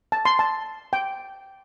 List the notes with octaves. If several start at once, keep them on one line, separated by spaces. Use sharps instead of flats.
A5
C6
A5
G5